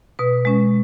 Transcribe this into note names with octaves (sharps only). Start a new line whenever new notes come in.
B2 B4
G#3 C#4